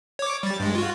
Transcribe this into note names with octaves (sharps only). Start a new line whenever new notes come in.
C#5 D6
G3 A6
G2 G#3
F4 F#4